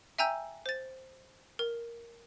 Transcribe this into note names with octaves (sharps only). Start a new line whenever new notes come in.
E5 G5 G#5 A#5 E6 G6
C5 A6
A#4